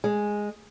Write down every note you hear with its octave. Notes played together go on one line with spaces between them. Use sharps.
G#3